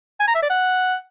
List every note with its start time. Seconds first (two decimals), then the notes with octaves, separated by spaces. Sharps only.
0.20 G#5
0.28 A#5
0.35 E5
0.42 D5
0.50 F#5